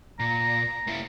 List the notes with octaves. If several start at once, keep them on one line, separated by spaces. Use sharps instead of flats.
A#2 A#5
A#3 E4